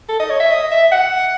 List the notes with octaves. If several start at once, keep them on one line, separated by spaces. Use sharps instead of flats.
A4
D#5
C#5
E5
D#5
E5
F#5